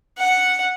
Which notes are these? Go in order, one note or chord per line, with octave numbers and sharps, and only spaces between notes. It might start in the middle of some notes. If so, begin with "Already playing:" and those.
F#5